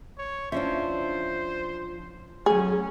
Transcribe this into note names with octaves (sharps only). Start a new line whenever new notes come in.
C#5
F3 C#4 D4 C5 E5
F#3 A3 C#4 G#4